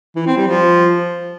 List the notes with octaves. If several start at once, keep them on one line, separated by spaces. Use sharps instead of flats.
E3
C4
G3
F3